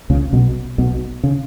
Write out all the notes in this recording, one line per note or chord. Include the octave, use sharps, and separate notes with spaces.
C#2 C#3
B1 B2
B1 B2
C#3